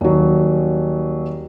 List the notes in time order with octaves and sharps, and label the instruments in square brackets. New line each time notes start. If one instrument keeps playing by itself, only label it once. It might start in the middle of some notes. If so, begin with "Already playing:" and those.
[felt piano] D#1 F#3